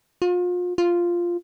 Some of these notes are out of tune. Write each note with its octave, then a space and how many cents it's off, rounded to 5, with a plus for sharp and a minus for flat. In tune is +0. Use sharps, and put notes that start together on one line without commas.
F4 +35
F4 -5